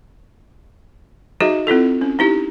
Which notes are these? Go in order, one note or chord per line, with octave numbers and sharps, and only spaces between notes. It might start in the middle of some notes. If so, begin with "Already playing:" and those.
D#4 F#4 G#4 D#5 E5
C4 E4 F4 A4
C#4
D#4 E4 G4